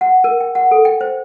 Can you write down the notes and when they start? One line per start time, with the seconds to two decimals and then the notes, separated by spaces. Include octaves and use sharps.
0.01 F#5
0.24 A#4
0.40 G5
0.55 F#5
0.71 A4
0.85 G5
1.01 C5